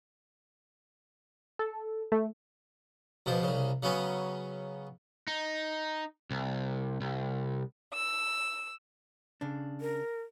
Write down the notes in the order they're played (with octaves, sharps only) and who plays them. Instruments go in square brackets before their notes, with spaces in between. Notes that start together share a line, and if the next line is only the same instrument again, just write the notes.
[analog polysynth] A4
A3
[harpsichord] C#2 B2 F3 C5
C2 C#3
C#3 F#3 B3 C#4
[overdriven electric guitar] D#4
C2
C2
[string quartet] E6
[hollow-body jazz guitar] C#3 D4
[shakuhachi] A#4